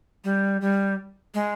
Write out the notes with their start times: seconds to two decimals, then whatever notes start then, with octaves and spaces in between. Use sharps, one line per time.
0.24 G3
0.61 G3
1.34 G#3